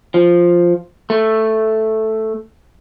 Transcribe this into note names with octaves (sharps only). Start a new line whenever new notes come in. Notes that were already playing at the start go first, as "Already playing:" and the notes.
F3
A3